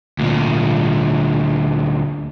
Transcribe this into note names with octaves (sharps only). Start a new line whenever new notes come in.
D2 A#2